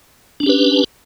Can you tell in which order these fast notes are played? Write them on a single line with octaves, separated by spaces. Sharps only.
D4 C#4 G4 B4